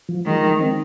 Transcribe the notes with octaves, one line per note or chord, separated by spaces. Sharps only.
F3
D#3 G#3
D#4
C4